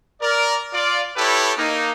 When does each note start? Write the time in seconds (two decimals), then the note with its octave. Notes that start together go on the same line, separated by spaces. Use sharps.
0.21 A#4 D5
0.73 F4 D5
1.17 E4 G4 A4 B4 C#5
1.58 A#3 D#4